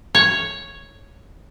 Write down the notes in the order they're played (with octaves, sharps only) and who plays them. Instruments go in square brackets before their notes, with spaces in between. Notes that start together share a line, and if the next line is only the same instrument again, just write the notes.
[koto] C#5